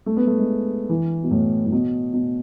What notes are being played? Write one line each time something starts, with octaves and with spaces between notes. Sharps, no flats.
A3
B3
A3
G#3
E3
B2
A2
A2
B2
B2